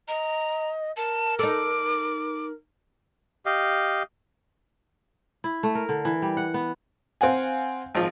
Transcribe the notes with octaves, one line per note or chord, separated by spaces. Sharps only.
D#5 A#5
A#4 A5
D#4 A4 D6
G4 D#5 F5
E4
A3
A#4
D3
E3
G3
F#5
B3
C4 F5 F#5 G#5
G#1 F3